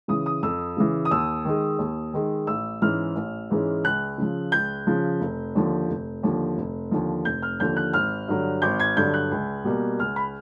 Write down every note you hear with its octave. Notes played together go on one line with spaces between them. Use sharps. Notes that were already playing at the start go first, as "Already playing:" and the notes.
C#3 E3 D#6
D#6
F2 E6
C#3 E3
D#6
D#2 E6
D#3 G#3
D#2
D#3 G#3
A1 E6
G#2 E3 G#3 C#4 F6
A1
G#2 E3 G#3 C#4
C#2 F#6
C#3 F3
C#2 G6
C#3 F3
F1
D#2 D3 F3
F1
D#2 D3 F3
F1
D#2 D3 F3
F1 G6
F6
D#2 D3 F3 G6
F#6
G#1 F6
G2 D3 F#3
G#1 G6
G#6
G2 D3 F#3 G6
F#6
C#2
B2 G3 A#3
C#2 F6
B5